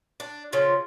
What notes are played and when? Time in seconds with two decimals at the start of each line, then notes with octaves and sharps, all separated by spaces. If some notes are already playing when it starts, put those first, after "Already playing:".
0.20 D4
0.53 C#3 F3 F4